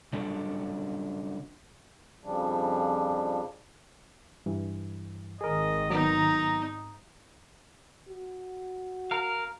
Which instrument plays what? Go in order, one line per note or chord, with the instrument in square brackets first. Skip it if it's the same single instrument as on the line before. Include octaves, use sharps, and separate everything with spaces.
[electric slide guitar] C#3 F#3 G3 D4 A4
[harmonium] F2 C#3 F3 G3 D4
[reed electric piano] G2 E3
[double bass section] G#1 D#3 [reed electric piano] G#4 A#4 [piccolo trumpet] D#5
[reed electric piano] F#3 B3 [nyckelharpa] D#4 [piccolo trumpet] A#5
[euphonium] F#4
[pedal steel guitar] A#4 F5